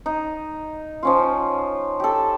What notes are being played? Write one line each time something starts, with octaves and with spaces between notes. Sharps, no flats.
D#4
F3 C#4 F4
G4 A4